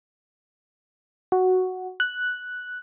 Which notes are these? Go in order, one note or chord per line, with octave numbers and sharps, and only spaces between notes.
F#4
F#6